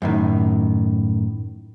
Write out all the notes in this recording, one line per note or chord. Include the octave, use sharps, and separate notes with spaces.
F#2 A2 D#3